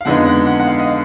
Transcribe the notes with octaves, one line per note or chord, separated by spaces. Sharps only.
F5
F2 D3 G#3 B3 D#4 F#5
F#5
F#5
F#5
F5
D#5
F5